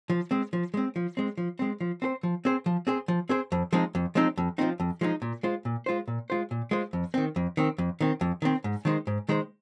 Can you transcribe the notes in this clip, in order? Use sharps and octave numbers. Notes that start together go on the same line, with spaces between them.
F3
G#3 C4
F3
G#3 C4
F3
G#3 C4
F3
G#3 C4
F3
C4 G#4 C5
F3
C4 G#4 C5
F3
C4 G#4 C5
F3
C4 G#4 C5
F2
F3 G#3 C4 D#4
F2
F3 G#3 C4 D#4
F2
F3 G#3 C4 D#4
F2
F3 G#3 C4 D#4
A#2
G#3 F4 C5
A#2
G#3 F4 C5
A#2
G#3 F4 C5
A#2
G#3 F4 C5
F2
D#3 C4
F2
D#3 C4
F2
D#3 C4
F2
D#3 C4
G#2
D#3 G#3 D#4 C5
G#2
D#3 G#3 D#4 C5